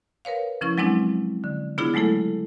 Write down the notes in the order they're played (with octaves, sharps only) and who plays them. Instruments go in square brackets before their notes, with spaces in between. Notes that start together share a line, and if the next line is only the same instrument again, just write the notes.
[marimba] A#4 B4 C#5 F5
C#3 F3 C#4 E4 C#6
F#3 G#3 C4 D4 E4
D3
C#3 B3 D4 E4 F4 G#4
F#3 G#3 A3 E4 A4